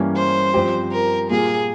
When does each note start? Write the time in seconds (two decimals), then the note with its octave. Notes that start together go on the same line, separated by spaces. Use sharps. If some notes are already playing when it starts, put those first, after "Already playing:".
Already playing: G2 E3 A#3 C#4 G4
0.16 C5
0.54 G2 F3 C4 G4
0.92 A#4
1.30 A#2 G3 A#3 F4 G#4